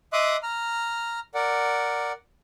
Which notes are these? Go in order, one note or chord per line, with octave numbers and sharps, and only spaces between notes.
D#5 E5 C6 D6 D#6 F#6
A#5 F6
A#4 D5 F#5